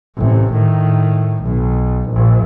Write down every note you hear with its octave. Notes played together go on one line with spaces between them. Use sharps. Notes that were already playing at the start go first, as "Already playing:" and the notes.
A1 C3
A2 D#3
B1
A#1